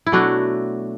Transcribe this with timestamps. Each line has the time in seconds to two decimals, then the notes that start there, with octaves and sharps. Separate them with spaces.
0.06 E4
0.12 B2 F#3 A3 D4 F#4